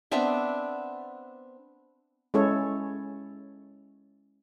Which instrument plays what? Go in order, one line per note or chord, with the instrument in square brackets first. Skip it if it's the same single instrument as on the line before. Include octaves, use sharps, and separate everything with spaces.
[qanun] B3 C4 D4 E5
[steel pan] G#3 C#4 E4 A4 C#5